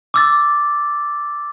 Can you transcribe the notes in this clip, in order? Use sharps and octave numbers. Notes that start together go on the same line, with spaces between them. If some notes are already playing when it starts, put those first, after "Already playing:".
D6 E6 A6